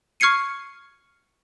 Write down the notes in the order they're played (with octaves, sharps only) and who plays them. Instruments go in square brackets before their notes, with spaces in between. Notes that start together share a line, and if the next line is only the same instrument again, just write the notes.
[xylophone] C#6 F6 G#6 C7 C#7 D#7